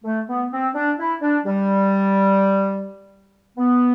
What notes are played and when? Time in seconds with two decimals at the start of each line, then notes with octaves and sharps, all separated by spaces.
0.04 A3
0.29 B3
0.52 C4
0.75 D4
0.99 E4
1.22 D4
1.46 G3
3.58 B3